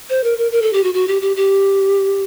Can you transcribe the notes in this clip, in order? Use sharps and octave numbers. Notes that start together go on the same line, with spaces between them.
C5
A#4
A#4
A#4
A4
G4
F#4
F#4
G4
G4
G4